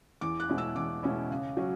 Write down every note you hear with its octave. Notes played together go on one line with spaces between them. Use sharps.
E2 D6
F#6
B2 G#3 C#4 E4
E6
E2 D6
B2 G#3 C#4 E4
C#3
F#3 C#4